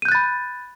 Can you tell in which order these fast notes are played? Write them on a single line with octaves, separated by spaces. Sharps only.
D#7 G6 F#6 A6 B5